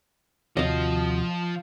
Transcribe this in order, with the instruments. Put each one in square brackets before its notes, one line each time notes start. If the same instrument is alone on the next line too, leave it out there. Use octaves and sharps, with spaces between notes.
[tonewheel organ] D#2 C3 F#4 [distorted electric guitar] F3 C5 [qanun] D#5 F5